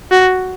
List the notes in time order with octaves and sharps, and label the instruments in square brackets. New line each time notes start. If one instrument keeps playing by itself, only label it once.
[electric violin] F#4